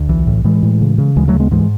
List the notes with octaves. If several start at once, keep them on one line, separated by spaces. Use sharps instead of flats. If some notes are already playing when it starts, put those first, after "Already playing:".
Already playing: D2
B1 E3
A2
A2 E3 G#3
A2
C#3
C#3
D2 E3 G#3
F#3 A3
C#3
G#3 B3
G#2 E3 G#3